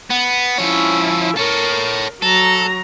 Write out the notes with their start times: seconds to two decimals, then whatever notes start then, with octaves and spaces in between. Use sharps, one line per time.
0.10 B3
0.58 F3 C#4 E4 C#5
1.37 A4 A#4 C#5
2.22 F#3 A4 A#5